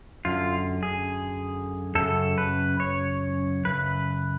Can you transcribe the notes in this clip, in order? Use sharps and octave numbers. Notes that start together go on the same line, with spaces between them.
F#2 D3 F4
G#4
F#2 C#3 A4
B4
C#5
F#2 C#3 B4